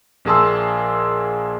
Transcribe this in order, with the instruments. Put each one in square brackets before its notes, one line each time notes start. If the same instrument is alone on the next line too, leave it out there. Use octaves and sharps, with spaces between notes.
[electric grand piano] A#1 A#3 G#4 A5 C6 E6